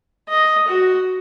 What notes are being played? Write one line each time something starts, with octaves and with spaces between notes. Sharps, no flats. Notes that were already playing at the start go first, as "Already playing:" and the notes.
D#5
F#4